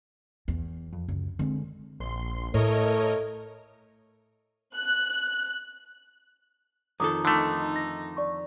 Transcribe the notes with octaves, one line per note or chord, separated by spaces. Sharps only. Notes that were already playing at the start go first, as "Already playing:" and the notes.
E2
F2
C#2 F#2
D3 G#3 C4
A#1 C6
A2 A3 A#4 C#5 D#5
F#6
F2 D#3 A4 A#5 D6 D#6
D3 A3 D#4
A#6
D5 C#6